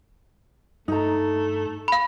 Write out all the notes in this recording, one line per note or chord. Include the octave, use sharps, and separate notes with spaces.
G2 A3 D#4 A#5
F5 B5